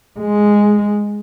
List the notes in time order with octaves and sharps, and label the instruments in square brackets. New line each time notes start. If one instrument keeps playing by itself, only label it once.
[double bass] G#3